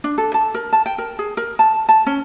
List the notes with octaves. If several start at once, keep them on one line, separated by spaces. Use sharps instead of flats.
D4
A4
A5
A#4
A5
G5
A#4
G#4
A#4
A5
A5
C#4